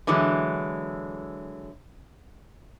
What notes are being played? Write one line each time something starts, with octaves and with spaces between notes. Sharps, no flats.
D3 E3 F#3 G#3